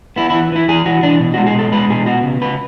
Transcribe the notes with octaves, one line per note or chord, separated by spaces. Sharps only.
B3 E4
E4
E3
E3 E4
E3 G#4
E3 F#4
E3 D4
B2
G#3 F#4
G#4
B2 A4
G#3 B4
B2 G#4
B3 F#4
C#3
C#3 B4